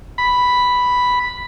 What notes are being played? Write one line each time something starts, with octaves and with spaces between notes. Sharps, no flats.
B5